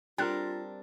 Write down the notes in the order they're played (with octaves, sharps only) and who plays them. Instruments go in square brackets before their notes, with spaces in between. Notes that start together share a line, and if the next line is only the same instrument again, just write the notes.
[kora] G3 C4 A#4 [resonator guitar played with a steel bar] D4 [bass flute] F4 [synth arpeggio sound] G5 F#6